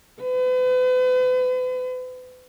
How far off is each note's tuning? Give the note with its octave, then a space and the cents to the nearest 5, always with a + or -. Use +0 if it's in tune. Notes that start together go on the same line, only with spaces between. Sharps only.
B4 +40